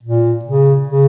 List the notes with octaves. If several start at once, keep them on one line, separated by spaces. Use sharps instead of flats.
A#2
C#3
C#3